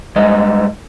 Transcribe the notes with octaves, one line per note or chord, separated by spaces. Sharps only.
G2 G#3 D#5